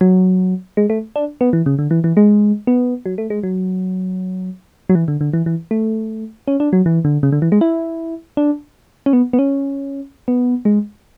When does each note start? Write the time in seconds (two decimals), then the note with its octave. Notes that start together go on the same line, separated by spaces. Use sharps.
0.01 F#3
0.77 G#3
0.90 A3
1.16 D4
1.41 B3
1.53 E3
1.66 C#3
1.79 D3
1.91 E3
2.04 E3
2.17 G#3
2.67 B3
3.06 F#3
3.18 A3
3.30 G#3
3.44 F#3
4.89 F#3
4.95 E3
5.08 D3
5.21 D3
5.33 E3
5.46 E3
5.71 A3
6.48 C#4
6.60 D4
6.73 F#3
6.86 E3
7.05 D3
7.23 C#3
7.32 D3
7.42 E3
7.52 G#3
7.61 E4
8.37 D4
9.06 C#4
9.13 B3
9.33 B3
9.39 C#4
10.28 B3
10.65 G#3